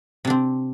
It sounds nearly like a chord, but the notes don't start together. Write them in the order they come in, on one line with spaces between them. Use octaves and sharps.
C3 D4 C4